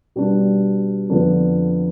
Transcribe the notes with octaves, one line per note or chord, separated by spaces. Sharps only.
B2 G3 D4
F2 D3 F3 B3 D4